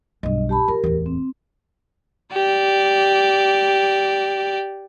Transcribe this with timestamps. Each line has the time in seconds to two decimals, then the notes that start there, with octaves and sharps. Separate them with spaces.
0.23 B1 G2 D#5
0.49 G4 A5 B5
0.68 F3 G4 A#4
0.84 D1 E2
1.06 C4
2.33 G4 D5